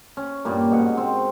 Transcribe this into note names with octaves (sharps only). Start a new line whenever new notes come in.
C#4
G2 A#2 G3 A#3
G#2 B2 F#5
C4